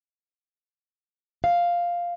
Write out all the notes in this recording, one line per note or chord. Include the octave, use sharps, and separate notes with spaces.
F5